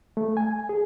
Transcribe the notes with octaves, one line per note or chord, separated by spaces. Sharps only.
A3
G#5
G#4